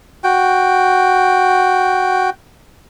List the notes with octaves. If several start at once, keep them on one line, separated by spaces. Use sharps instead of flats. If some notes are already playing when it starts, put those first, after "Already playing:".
F#4 G5